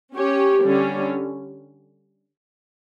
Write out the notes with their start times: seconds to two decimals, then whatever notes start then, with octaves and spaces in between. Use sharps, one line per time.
0.14 C#4 G4 C#5
0.63 D3 G3 C#4